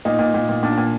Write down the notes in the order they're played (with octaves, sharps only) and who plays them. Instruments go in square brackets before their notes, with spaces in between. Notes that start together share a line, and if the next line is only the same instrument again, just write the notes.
[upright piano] A#2 D#4
A#2
A#2
A#2
A#2 D4
A#2